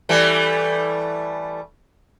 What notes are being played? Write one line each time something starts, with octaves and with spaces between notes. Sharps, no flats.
E3 G3 A3